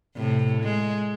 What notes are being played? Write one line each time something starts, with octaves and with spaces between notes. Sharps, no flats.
A2 C3
G#3